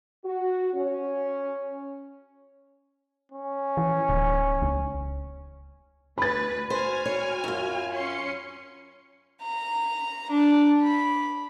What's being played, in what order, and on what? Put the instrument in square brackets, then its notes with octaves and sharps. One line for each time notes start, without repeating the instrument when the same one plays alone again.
[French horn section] F#4
C#4
[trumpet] C#4
[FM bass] E3
D1
C#2
[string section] D2 B4 [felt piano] B5 A6
[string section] F#4 G#5 F6 [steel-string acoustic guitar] C5
[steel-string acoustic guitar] C#5
F#2 F4
[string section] C#4 C6 C#7
[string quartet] A#5
D4
B5